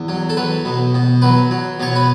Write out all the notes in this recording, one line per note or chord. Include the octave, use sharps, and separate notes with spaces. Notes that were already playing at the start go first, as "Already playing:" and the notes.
Already playing: E2
F#3
A4
F#3 B4
B2
B2
F#3 B4
F#3
B2 C#5
B4